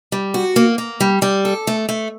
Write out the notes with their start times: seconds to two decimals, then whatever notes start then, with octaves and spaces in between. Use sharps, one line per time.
0.12 G3
0.34 F#4
0.56 A#3
0.78 A#3
1.00 G3
1.22 G3
1.45 A4
1.67 A3
1.89 A3